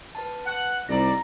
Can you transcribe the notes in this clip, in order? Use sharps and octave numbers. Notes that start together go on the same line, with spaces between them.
B4 A5
F#5
C2 G#2 D5 A#5 A#6